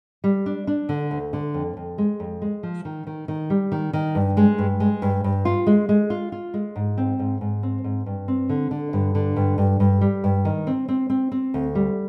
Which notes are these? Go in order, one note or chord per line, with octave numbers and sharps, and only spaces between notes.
G3
D4
D4
D3
D2
D3
F2
F2
G#3
F2
G#3
F3
D#3
D#3
D#3
G3
D#3
D#3
G2
G#3
G2
G#3
G2
G2
F4
G#3
G#3
F4
F4
G#3
G#2
C4
G#2
G#2
C4
G#2
G2
C4
D3
D3
G2
D3
G2
G2
G2
G3
G2
D#3
C4
C4
C4
C4
D2
G3